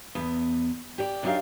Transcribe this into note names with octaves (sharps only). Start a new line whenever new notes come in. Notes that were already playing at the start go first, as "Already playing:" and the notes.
E2 B3
G4 D5
F#2 F#3 D4 D#4 G4 F5